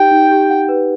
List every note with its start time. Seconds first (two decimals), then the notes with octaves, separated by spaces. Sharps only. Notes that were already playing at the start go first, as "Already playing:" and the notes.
Already playing: D#4 G4 G5
0.11 D#4
0.31 G4
0.50 F#5
0.69 B4